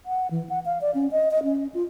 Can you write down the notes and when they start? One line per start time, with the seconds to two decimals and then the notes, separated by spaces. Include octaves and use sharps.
0.06 F#5
0.31 E3
0.50 F#5
0.65 F5
0.81 D5
0.95 C#4
1.12 D#5
1.31 D#5
1.43 C#4
1.74 F4